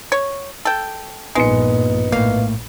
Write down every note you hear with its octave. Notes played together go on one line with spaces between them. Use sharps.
C#5
A4 G5
A#1 G2 A#2 G#3 B3 D#4 C#7
A2 A#3 F5